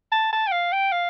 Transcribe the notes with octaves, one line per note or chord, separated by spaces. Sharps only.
A5
A5
G5
F5
G5
F5